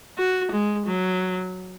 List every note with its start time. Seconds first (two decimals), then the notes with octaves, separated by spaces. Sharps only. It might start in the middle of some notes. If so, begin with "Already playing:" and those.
0.18 F#4
0.52 G#3
0.87 F#3